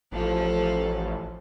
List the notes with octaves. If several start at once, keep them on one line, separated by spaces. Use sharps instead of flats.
A1 F3 A4